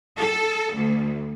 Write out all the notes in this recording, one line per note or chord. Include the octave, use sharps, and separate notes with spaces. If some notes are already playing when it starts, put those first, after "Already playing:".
A4
D2